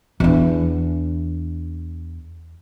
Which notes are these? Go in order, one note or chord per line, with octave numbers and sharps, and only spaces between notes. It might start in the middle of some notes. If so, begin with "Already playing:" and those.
E2 D4